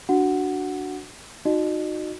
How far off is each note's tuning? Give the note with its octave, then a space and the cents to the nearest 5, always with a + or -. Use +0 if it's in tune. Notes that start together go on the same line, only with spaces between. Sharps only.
D4 +0 F#4 +0 F#5 +0
D#4 +0 F#4 -20 D#5 -40